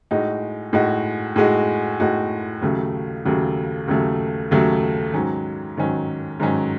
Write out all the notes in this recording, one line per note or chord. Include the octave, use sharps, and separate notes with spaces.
A2 G#3 D#4 F#4
A2 G#3 D#4 F#4
A2 G#3 D#4 F#4
A2 G#3 D#4 F#4
D#2 C#3 F#3 A3
D#2 C#3 F#3 A3
D#2 C#3 F#3 A3
D#2 C#3 F#3 A3
G#2 D#3 F#3 C#4
G#2 D#3 F#3 C#4
G#2 D#3 F#3 C#4